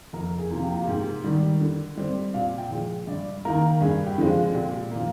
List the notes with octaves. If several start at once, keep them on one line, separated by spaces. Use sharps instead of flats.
F2 A#4
G#4
C3 F3 A#3
G4
F4
G#2 G4
D#3 G3
D3
G3 C4
A#2 F5
G5
F3 G#3
G2 D5
D#3 A#3 A#4
G2 G#4
G4
D3 F3 G#3 C4
F4
A#2 G4
A#3
F3